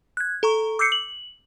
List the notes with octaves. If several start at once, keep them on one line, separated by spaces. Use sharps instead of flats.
F#6 G#6
A4 A#5 C#6
D6 E6 G6 C7 C#7
F#7